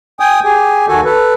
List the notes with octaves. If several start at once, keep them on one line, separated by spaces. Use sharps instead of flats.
G5 G#5 D#6
G4 G#4 G#5
D#2 D#3 F#4 A4 G#5
A4 B4